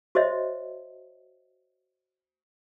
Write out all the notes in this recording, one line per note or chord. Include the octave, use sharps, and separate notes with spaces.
F#4 C5 C#5 D#5 E5